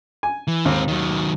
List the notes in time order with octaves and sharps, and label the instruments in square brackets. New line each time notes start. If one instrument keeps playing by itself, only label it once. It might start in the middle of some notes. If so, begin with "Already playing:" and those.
[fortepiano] G#5
[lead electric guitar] E3
[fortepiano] D#2 [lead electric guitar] G#2 C4
[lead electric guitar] D#3 F#3